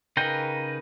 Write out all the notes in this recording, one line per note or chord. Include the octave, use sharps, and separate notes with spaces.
C#3 D#4 A#4 B4 G5